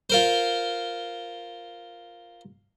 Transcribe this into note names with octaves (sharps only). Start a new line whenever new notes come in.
F4 A#4 C5